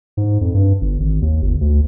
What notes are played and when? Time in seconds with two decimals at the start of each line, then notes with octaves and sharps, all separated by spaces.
0.17 G#2
0.41 F2
0.54 G2
0.81 G1
1.00 G#1
1.22 D#2
1.42 G1
1.61 D2